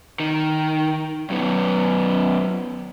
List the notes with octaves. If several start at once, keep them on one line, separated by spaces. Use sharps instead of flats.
D#3
F#2 B3